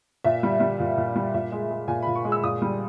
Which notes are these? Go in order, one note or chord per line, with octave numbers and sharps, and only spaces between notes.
A#2 E5
G3
G3
A#2
A#2
G3
A#2 E5
G#3
G#3
A#2 G#5
B5
A#2
C#6
G#3
E6
A#2 D#6
G3